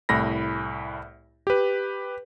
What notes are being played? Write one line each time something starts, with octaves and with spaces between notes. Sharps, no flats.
C2 A2 B5 A#6
G4 B4